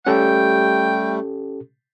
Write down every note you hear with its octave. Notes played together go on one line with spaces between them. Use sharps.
G3 A3 C#4 G4 A4 G5